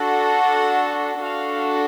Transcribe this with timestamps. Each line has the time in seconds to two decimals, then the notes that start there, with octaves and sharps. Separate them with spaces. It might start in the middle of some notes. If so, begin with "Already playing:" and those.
Already playing: D4 F#4 A4 F#5
1.22 D4 F#4 A4 F5